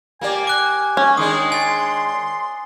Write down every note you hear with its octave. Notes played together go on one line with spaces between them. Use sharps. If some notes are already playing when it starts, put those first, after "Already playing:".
A#3 G4 D5 G#5
D6 F#6
C#4 G#5
D#3 G#3 D4 C6 D#6
G#5 A6